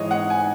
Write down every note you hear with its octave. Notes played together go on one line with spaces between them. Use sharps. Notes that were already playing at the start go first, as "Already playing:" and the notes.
Already playing: G#2 E3 G#3 C#5 D#5
F#5
G#5